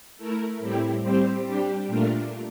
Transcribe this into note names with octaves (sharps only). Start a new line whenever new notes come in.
A3 E4 A#4
A2 G3 C4 E4 G4
G3 C4 G4 C5
G3 D4 G4
A#2 A3 D4 F4 A#4